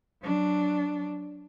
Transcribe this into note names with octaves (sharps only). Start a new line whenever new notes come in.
F#3 D4